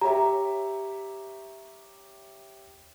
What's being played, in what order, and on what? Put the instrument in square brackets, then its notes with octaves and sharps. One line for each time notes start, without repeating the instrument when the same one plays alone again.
[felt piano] G4 C#5 E5 [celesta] A#5